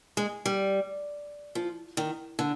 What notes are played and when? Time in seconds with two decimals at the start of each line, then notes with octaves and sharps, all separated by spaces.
0.17 G#3
0.46 G3
1.55 F3
1.97 D#3
2.39 D3